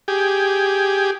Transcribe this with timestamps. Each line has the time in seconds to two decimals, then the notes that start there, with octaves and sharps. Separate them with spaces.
0.08 G4 G#4